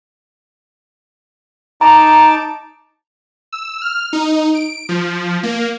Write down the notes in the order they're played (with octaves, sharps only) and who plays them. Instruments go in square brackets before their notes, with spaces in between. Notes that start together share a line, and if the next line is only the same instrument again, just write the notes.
[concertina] D#4 A5 D6 [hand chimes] A#5
[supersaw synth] E6
F6
D#4
D7
F3
A#3